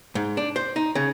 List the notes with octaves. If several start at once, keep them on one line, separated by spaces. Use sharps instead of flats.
G#2
D4
C5
D#4
C#3